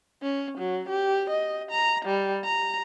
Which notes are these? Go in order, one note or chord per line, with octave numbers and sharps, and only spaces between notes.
C#4
F#3
G4
D#5
A#5
G3
A#5